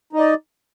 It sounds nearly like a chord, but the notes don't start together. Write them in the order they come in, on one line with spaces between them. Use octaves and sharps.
D#4 D#5 D5